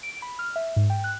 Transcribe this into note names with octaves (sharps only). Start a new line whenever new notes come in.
D7
B5
F6
E5
G#2
G5
F#6